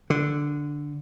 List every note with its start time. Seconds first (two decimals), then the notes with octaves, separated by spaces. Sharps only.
0.10 D3